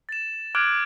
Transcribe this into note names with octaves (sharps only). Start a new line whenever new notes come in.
A6 E7
D6 F6 F#6 G#6 D7 F#7